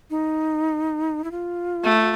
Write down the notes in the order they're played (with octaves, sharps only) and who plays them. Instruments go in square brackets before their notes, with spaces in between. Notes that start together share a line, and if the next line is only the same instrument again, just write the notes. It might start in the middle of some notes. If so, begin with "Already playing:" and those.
[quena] D#4
E4
F4
[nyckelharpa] A3